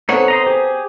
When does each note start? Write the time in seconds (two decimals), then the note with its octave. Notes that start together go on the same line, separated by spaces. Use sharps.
0.09 B3 C4 D#4 A4 C#5 F#5
0.28 C5 D#5 A#5
0.46 G4 G#4